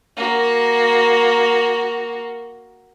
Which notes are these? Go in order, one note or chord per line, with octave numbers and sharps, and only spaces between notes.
A#3 F#4